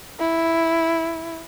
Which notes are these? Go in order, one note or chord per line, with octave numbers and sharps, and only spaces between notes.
E4